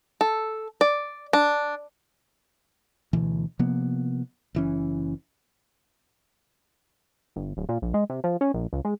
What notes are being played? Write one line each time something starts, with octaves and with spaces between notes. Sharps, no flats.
A4
D5
D4
D2 B2 E3
C3 F3 A#3 B3
F#1 E3 C#4
G1
D1
A#2
A#1
G#3
C3
F3
C#4
A#1
C#2
G#3